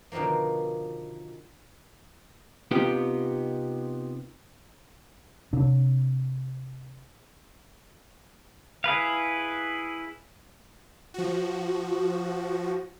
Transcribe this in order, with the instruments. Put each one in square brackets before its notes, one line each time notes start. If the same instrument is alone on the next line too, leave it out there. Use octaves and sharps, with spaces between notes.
[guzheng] B2 D3 D#3 F3 A#3
[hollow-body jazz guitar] C3 B3 D#4 F4 G4
[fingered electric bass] C3 D4
[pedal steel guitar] E4 G#4 B4 F5
[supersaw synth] F3 F#4